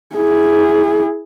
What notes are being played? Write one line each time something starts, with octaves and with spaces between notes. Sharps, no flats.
E4 G#4